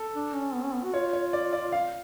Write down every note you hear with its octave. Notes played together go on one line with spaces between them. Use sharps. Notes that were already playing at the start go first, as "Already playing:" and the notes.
Already playing: A4
D4
C#4
B3
C#4
B3
F#4
F4 C#5
C#5
D5
D5
F5